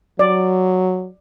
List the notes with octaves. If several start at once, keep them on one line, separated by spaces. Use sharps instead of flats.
F#3 D5